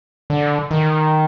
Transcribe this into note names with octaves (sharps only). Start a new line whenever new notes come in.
D3
D#3